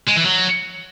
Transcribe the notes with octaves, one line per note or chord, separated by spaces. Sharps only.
G#3
E3
F#3